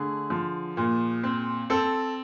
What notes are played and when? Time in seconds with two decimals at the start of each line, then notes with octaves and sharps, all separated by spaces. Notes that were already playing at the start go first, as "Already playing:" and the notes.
Already playing: D3 A3 G#4
0.30 F3
0.77 A#2
1.23 C4
1.70 C4 A4